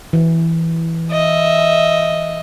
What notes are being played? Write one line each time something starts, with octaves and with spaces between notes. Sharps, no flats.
E3
D#5 E5